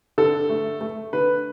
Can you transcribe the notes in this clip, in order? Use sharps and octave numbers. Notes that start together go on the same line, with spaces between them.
D3 A4
A3
A3
D3 B4